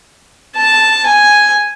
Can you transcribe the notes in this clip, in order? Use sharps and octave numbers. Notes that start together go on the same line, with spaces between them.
A5
G#5